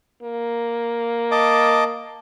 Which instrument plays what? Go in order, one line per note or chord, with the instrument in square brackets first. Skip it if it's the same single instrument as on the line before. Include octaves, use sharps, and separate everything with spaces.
[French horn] A#3
[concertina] D#5 A5 D6